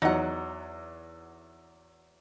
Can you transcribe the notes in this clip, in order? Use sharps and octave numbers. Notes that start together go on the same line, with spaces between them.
E2 F#3 D#4 F#5